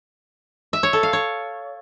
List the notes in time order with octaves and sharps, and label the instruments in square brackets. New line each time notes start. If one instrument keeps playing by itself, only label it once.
[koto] E5
C#5
A4
F5
C#5